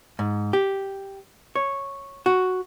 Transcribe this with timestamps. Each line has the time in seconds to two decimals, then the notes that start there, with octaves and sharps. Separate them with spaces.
0.19 G#2
0.53 G4
1.56 C#5
2.26 F#4